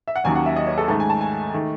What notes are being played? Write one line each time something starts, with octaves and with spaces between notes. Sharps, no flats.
E5
F#5
D#2 D#3 F#3 C#4 G#5
F#5
E5
D#5
C#5
A4
G#2 D#3 A3 A4
G#5
A5
G#5
D#3 A3